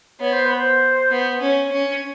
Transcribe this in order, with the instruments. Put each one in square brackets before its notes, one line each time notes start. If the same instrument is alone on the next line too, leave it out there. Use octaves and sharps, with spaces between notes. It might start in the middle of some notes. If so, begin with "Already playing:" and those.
[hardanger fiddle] B3 [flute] C#5
[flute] C5
B4
C5
[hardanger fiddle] B3
C#4
C#4